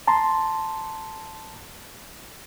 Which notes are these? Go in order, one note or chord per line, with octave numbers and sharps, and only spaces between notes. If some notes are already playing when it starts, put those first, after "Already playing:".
A5 A#5 C6